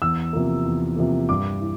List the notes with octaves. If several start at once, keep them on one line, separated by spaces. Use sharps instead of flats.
E2 E6
C3 F3 A#3
E2
C3 F3 A#3
G2 D6
E3